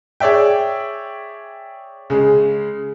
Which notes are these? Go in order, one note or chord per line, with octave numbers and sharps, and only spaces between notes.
G#4 C#5 D5 E5 G5
C#3 G#3